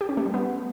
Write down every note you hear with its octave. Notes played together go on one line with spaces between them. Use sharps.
G4
C#4
A3
G3
B3